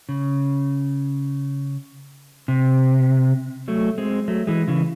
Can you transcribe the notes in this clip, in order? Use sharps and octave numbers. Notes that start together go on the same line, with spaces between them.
C#3
C3
F#3 A3
G#3 C4
F#3 A3
E3 G#3
C#3 E3